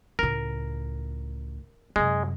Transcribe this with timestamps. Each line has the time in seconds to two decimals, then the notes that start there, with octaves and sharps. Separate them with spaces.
0.19 C#2 A2 A#4
1.96 F#2 C3 G#3